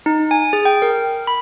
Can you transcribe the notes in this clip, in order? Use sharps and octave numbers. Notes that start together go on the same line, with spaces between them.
D#4
G#5
G#4
G5
A#4
B5